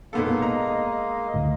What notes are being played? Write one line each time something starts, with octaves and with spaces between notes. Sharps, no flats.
A#2 G#3 A#3 B3 D#4 A4 F5
D#5 A#5
D2 A2